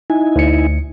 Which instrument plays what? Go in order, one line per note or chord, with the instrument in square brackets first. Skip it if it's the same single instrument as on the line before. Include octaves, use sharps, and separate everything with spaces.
[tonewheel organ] D#4 E4 G#5
[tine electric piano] D2 C#7